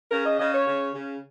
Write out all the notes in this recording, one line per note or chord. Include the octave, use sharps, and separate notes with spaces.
C#3 A#4
D#5
C#3 D#5
C#5
C#3
C#3